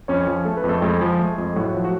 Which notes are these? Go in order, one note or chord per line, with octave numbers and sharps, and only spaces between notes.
F2 C#4 C#5
F3
A3 A4
B4
F2
A3 A4
F2 G#3 G#4
F3
A3
F2
A2 F#3 F#4
F3
F#4